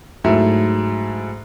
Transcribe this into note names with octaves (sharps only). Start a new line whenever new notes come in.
G#2 F#3 A3 E4